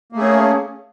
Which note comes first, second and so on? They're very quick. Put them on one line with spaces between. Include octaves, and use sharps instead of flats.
A#3 A3 G#4 C#4